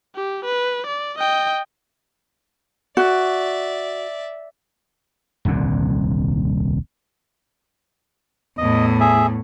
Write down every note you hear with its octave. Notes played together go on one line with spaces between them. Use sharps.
G4
B4
D5
D#5 G5
F#4 D5 E5
D#1 C2 F2 D3
E2 A2 D#5
G#4 E5